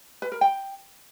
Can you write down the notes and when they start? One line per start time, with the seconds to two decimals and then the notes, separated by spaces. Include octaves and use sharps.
0.22 B4
0.32 A#4
0.41 G5